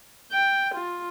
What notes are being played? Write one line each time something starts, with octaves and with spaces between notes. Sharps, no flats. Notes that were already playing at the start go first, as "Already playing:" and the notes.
G5
F4